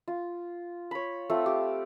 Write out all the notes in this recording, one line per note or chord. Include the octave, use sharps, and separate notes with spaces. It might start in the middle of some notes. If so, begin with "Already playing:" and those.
F4
C#5 B5
A3 C4 F4
G4